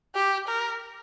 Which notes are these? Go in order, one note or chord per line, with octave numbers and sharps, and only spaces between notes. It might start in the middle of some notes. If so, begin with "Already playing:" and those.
G4
A#4